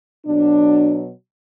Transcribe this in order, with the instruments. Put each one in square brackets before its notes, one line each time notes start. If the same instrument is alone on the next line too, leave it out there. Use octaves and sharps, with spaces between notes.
[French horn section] B2 F#3 D4